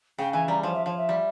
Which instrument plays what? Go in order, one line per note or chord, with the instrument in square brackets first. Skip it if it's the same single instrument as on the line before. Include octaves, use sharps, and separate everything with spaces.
[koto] C#3 [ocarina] G5
[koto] E3 [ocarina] G#5
[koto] G3 [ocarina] A#5
[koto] F3 [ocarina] C#5
[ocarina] E5
[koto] F3 [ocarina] C#5
[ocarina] E5
[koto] G3